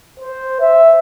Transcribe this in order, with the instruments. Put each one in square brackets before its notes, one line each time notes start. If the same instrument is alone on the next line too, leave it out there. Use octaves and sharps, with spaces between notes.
[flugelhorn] C5
E5